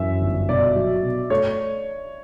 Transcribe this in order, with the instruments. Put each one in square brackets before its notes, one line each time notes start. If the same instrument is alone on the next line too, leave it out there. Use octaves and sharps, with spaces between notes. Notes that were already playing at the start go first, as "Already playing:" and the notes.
Already playing: [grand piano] F#2 E3 [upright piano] E5
[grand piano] G1
[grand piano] B2 [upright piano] D5
[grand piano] F#3
B2
[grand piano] A3 [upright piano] C#5